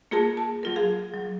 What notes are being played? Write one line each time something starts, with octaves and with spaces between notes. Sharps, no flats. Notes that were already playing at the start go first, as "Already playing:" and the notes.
A#3 F4 G#4 A#4 A5
A5
F#3 F4 A#4
G#4 F5
F#3